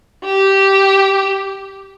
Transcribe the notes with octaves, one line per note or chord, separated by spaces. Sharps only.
G4